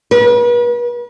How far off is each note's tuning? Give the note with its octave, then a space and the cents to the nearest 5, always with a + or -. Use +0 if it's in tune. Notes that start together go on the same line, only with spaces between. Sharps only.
B4 -40